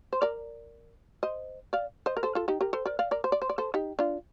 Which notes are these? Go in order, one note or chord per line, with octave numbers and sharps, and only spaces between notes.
C5
A#4 D5
C5 D#5
D5 F5
C5 D#5
A#4
A4 C5
F4 A4
D#4 G4
G4 A#4
A4 C5
A#4 D5
D5 F5
A#4 D5
C5
D5
C5
D5
A4 C5
D#4 G4
D4 F4